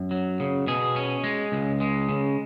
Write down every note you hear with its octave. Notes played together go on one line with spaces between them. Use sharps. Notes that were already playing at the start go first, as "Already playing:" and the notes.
Already playing: F#2
F#3
C#3
B2 G#4
C#4
G#3
C#2
G#3
C#3